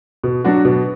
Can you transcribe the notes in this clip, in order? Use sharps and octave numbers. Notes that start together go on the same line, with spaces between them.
B2
F#3 D4 F#4
B2